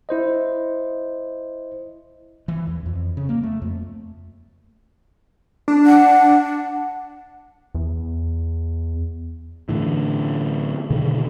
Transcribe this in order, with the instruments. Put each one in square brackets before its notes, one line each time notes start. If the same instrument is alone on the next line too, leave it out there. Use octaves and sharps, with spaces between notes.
[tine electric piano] E4 C5 D#5
[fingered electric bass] E3
E2
F2
C#3
A#3
A3
F2
[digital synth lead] D4
[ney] F#5
[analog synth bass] E2
[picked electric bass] A2 D3 E3
B2 D3 D#3